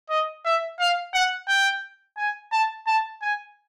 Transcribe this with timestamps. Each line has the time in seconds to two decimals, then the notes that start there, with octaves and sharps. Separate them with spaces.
0.10 D#5
0.45 E5
0.80 F5
1.14 F#5
1.48 G5
2.18 G#5
2.52 A5
2.87 A5
3.22 G#5